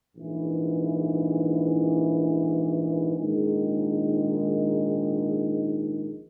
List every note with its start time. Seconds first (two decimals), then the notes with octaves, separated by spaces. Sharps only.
0.16 A#1 G#2 E3
3.17 A#1 G#2 D#3 G#3